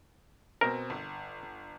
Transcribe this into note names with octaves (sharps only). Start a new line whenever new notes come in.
B2 C4 A#4
G1